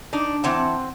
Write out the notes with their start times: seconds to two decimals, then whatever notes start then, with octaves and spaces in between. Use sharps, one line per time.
0.13 D4 D#4
0.44 E3 C4 F#5 A5